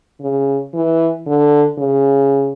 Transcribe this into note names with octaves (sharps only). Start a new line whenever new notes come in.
C#3
E3
D3
C#3